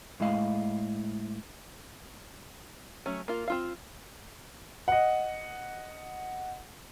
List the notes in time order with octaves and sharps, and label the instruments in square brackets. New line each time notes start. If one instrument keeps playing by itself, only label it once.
[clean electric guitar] A2 G#3 E4 D#5 F5
[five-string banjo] F#3 A3 C#4
A#3 F4
C4 F4 F5
[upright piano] D#5 F#5